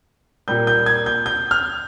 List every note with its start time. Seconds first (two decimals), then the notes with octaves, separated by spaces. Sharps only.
0.48 A#2 G3 A#3 G6
0.67 G6
0.86 G#6
1.06 G6
1.26 G6
1.51 F6